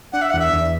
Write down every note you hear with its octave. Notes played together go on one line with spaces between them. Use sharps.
D4 F#5
E5
E2 F#5
E5
E2